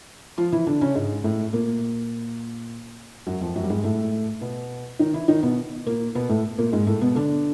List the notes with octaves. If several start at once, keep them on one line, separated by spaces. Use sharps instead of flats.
F3 F4
E3 E4
D3 D4
C#3 C#4
G#2 G#3
A2 A3
A#2 A#3
F#2 F#3
F2 F3
F#2 F#3
G3
G#2 G#3
A2 A3
B2 B3
D#3 D#4
E3 E4
D#3 D#4
B2 B3
A#2 A#3
B2 B3
A2 A3
A#2 A#3
G#2 G#3
A2 A3
B2 B3
D3 D4